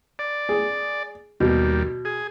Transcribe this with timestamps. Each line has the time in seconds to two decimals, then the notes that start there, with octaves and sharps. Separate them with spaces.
0.19 D5
0.49 G#4
1.40 D#2 B2 G3
2.05 G#4